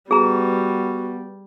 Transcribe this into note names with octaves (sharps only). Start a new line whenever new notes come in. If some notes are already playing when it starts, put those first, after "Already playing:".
G3 B3 F#4 G#4 A#5